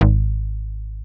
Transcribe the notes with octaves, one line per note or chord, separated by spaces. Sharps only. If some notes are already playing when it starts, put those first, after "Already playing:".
G#1